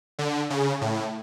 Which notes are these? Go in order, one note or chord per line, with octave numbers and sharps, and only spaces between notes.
D3
C#3
A2